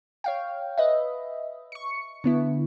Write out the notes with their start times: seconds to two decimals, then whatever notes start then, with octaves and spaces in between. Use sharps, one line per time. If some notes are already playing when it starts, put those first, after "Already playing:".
0.24 C#5 F5 G5
0.78 B4 D#5 E5
1.72 C#6 C#7
2.24 D3 B3 E4